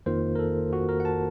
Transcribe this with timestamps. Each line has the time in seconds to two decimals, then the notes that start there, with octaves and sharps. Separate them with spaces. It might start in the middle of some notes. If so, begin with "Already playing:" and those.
0.06 F2 D#3 A#3 F4 C5
0.35 A#4
0.39 A4
0.73 F#4
0.89 A#4
1.00 F#5
1.05 A5